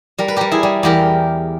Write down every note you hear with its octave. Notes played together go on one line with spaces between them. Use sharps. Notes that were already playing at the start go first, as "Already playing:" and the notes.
G3 A#4
B4
G3 G4 A#4
E4 G#4
G3
E2 G4 A#4